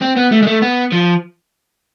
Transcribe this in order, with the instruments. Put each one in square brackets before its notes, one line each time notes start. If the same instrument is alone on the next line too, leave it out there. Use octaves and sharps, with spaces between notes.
[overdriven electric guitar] C4
B3
A3
G#3
A3
B3
F3